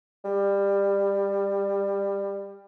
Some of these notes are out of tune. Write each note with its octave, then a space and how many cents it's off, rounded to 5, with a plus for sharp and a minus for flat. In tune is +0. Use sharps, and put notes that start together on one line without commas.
G3 +20